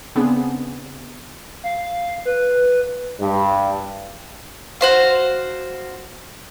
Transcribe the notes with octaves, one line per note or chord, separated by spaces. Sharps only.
C#3 B3 C4 D4 G#4
F5
B4
G2
F#4 C5 F5